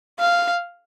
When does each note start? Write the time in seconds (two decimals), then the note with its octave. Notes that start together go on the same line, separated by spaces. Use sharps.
0.20 F5